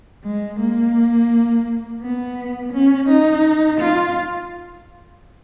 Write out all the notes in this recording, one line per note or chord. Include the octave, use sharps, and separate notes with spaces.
G#3
A#3
B3
C#4
D#4
F4